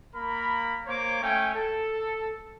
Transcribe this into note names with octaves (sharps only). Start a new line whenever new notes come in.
A#3 A#4 B5
A#3 C5 C#5 D6
A3 C#4 G5 G#5
A4